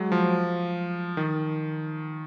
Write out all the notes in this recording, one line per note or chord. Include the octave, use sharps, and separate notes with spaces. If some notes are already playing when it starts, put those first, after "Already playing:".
Already playing: F#3 G#3
F3
D#3